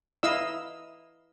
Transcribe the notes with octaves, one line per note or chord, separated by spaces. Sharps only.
E4 D#5 F5 E6